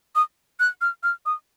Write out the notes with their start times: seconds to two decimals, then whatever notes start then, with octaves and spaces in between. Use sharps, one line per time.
0.15 D#6
0.60 F#6
0.81 F6
1.03 F6
1.26 D#6